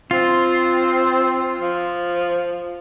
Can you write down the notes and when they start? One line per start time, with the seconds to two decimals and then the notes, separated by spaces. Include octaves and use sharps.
0.11 C4 F4
1.61 F3